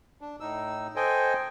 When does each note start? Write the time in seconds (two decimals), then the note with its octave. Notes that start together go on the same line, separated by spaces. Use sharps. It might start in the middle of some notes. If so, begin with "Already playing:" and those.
0.21 D4
0.40 A2 D#4 E6
0.96 A4 C5 D#5 G5 G#5